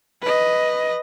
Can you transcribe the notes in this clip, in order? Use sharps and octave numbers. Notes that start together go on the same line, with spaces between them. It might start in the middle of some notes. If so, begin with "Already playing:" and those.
B4 D#5